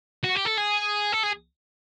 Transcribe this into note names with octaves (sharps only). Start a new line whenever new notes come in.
F#4
G4
A4
G#4
A4
G#4